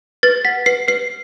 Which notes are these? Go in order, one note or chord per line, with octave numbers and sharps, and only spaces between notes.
B4 A6
F#5 B6
B4 C7
B4 C7